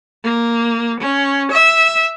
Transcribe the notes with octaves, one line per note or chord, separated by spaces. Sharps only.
A#3
C#4
E5